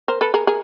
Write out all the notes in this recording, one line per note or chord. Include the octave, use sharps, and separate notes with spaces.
A#4 C5
A4 B4
G#4 A#4
G#4 A#4